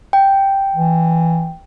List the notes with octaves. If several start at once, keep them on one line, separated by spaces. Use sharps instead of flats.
G5
E3